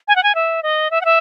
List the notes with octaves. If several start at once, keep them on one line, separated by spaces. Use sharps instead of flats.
G#5
F#5
G#5
E5
D#5
E5
F#5
E5